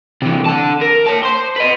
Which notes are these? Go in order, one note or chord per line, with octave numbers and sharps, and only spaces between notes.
C3 E3
D3 A5
A#4
C#5 A5
C5 C6
B4 D#5